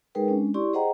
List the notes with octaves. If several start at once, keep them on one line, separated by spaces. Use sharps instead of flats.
G#3 D#4 G#4 A#4 B4 G5
G#3 C#4 D4
E4 G4 D5 C6 C#6
G#4 C5 D#5 F#5 G5 A#5